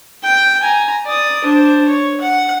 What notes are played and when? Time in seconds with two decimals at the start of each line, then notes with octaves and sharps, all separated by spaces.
0.24 G5
0.62 G#5 A#5
1.06 D5 D#6
1.44 D4 C5
1.88 C#5
2.20 F#5